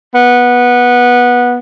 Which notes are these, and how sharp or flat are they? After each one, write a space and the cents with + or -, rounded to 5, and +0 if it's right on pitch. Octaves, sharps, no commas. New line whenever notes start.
B3 -15